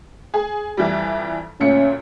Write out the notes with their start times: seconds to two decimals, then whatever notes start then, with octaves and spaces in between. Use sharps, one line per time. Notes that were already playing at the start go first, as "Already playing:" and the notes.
0.34 G#4
0.77 F2 E3 G3
1.60 D2 A#2 C#4 C#7